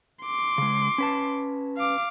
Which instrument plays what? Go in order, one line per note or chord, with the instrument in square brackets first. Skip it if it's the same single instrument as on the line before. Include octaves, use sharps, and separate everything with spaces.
[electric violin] C6 D6
[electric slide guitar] C#3 G#3
C#4 B4 A5
[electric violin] F5 D6